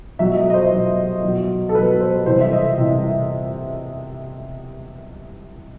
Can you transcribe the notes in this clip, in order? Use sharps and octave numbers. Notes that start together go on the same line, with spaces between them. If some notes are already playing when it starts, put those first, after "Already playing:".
B2 F#3 E5
D#5
D#5
C5
B2 F#3
B2 F#3
A4
B2 F#3 B4
C5
C3 E3 G3 C5
E5
D#5
C3 E3 G3